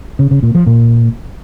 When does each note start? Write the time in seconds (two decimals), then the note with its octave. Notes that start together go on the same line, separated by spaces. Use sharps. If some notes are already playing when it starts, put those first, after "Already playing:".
0.19 C#3
0.31 C#3
0.43 A#2
0.55 F3
0.66 A#2